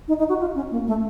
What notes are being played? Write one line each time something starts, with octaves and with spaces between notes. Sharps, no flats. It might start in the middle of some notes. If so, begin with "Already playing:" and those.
D#4
D#4
F#4
F4
C#4
A#3
A3